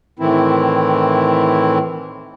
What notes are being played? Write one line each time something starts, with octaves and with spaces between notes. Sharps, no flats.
A2 D#3 E3 C4 E4